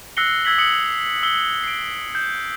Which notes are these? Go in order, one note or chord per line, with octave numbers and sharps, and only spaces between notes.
E6 F#6 A#6 C7 C#7 G7
E6 F#6 G#6 A#6 B6 F#7
D#6 G#6 C#7 F#7
E6 C7 G7
C7 D7
G6